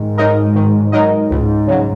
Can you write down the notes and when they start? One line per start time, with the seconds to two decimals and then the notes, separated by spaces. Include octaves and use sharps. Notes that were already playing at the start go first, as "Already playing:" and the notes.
Already playing: G#2 D#3
0.18 F#3 D#4 A#4 D#5
0.55 D#3
0.92 F#3 D#4 A#4 D#5
1.30 C#2 G#2
1.67 C#3 F#3